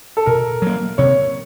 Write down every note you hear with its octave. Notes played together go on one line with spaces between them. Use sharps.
A4
B2 A#4
F#3 A#3
C3 C#5